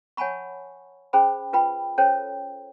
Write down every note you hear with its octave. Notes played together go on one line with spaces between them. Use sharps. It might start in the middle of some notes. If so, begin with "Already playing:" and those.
C#5 F#5 G#5 A5 B5 C#6
C#4 G#4 C5 G5 B5
F4 B4 G5 B5
C#4 A4 C5 C#5 G5 A5